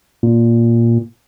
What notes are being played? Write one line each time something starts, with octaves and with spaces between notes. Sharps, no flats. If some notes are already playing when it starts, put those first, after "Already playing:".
A#2